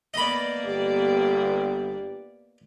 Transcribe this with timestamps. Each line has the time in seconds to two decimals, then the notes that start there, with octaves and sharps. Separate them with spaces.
0.14 A#3 B3 D5 D#5 B5
0.64 G1 G4